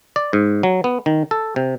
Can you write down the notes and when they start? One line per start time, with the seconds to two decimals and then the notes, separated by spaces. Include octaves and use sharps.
0.16 D5
0.33 G#2
0.63 F#3
0.84 B3
1.06 D#3
1.31 A4
1.56 C3